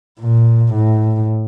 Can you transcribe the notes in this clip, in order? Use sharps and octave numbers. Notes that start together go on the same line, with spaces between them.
A#2
A2